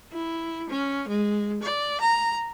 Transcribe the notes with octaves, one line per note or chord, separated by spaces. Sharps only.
E4
C#4
G#3
D5
A#5